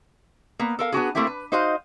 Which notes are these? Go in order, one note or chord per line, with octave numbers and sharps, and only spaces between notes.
A#3 B3
A4 A#4 F5
B3 D4 F#4 G#4
A3 A#3 C4 E4 G4
B4
D#4 F#4 C5 D#5 F5